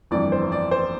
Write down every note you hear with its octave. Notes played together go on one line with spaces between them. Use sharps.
G1 F2 E3 D5
C5
D5
C5